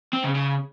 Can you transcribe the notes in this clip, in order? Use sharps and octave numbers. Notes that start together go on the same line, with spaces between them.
C4
C#3
C#3